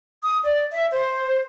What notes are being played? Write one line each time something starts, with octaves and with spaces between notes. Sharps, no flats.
D#6
D5
E5
C5